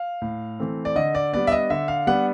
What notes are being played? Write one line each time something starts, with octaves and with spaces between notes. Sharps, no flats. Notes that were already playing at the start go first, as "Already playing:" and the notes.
Already playing: F5
A2
E3 A3 C4
D5
D3 D#5
D5
G3 B3 D4 D5
E5
D#5
D3 E5
F5
G3 B3 D4 F#5